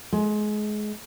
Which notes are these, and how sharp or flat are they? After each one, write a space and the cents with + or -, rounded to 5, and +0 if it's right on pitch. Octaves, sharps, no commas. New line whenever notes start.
G#3 +25